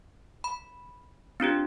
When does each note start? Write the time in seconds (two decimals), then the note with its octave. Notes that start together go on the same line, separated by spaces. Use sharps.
0.44 B5
1.40 C4 D4 F4 G4